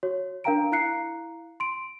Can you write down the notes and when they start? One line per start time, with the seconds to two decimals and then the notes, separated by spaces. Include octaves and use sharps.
0.03 F#4 C#5
0.44 D4 A#4 F5 G5 A#5 D7
0.72 E4 F5 A#5 F#6 C7 C#7
1.60 C6 D7